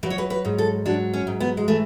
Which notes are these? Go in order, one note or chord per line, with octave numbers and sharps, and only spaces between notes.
F#3 B4
C#5
B4
B4
G#2
A4
F#3 D4
C#4
G#2
B3
G#3
E3 A3